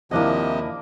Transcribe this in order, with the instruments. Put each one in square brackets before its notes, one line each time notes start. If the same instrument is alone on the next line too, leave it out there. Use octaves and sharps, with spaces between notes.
[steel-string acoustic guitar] D#2 E4 [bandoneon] C3 F3 D#5 [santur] A#3 D4 G#5